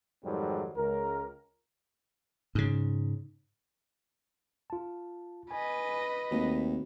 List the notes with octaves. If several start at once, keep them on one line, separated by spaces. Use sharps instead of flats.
F2 G#2 D#3 F#3 G3 C4
C#2 A#4
G#2 C#3
F4 A5
B4 D#5 G#5
D#2 A3 C4 F#4